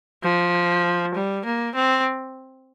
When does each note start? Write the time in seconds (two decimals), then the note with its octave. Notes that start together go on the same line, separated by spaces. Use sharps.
0.23 F3
1.15 G3
1.45 A#3
1.75 C4